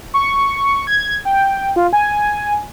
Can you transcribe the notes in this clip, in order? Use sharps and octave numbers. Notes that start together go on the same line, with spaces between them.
C#6
G#6
G5
F4
G#5